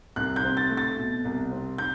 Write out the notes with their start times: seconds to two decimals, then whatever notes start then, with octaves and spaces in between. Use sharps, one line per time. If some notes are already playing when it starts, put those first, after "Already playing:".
0.16 C2 F#6
0.36 G6
0.44 C4
0.57 A6
0.70 A3
0.77 A6
0.97 B2
1.25 C2
1.51 C4
1.78 G6